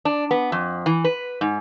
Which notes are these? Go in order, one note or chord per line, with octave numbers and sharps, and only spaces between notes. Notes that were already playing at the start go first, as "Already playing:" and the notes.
D4
B3
F2
E3
B4
G#2